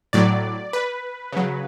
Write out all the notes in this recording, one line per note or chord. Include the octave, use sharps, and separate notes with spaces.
A2 F#3 D5
B4
C#3 F#3